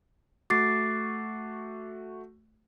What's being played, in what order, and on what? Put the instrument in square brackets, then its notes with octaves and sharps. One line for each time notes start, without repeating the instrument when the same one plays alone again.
[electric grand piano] A3 F#4 [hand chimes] D6 A6 C7